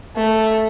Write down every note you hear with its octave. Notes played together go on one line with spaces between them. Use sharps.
A3